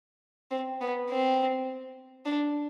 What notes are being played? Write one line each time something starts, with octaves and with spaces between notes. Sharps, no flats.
C4
B3
C4
D4